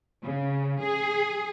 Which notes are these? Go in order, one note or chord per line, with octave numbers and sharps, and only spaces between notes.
C#3
G#4